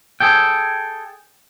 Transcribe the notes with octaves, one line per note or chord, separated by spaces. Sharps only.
G#4 A4 G5